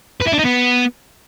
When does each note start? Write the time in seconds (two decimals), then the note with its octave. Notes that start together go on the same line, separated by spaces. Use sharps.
0.20 B4
0.26 E4
0.32 D4
0.38 D#4
0.44 B3